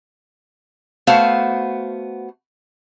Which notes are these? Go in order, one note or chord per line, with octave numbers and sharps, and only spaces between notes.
A3 B3 F#4 C5 F5